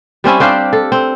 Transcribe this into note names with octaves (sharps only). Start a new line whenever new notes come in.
G3 C4 C#4 E4
C4 D4 G4 F5
A4
C4